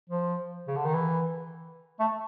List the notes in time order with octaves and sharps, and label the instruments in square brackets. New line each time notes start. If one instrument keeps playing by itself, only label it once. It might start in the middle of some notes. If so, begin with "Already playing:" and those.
[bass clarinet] F3
C#3
D3
D#3
E3
A3